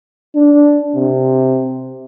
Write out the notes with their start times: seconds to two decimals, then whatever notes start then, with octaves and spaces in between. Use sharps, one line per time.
0.35 D4
0.95 C3